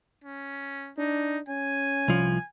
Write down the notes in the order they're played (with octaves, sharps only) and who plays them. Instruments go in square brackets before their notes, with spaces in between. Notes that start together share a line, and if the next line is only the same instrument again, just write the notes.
[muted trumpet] C#4
[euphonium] D4 [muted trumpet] D#4
[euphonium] C#4 [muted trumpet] G#5
[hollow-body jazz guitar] C2 F3